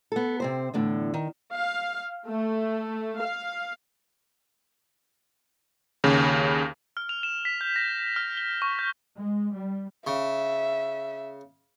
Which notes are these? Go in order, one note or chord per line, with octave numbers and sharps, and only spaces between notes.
B3 A4
C3 C4 C5
E2 A2 D3
D#3
F5
A3
F5
D#2 C#3
F6
F7
E7
B6
G6
A#6
F6
G7
C#6
G6
G#3
G3
C#3 E5